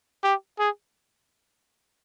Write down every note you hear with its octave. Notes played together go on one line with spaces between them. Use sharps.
G4
G#4